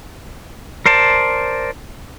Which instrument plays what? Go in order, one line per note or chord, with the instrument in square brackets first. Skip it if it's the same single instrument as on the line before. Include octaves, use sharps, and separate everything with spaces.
[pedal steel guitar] A#4 C5 D5 A5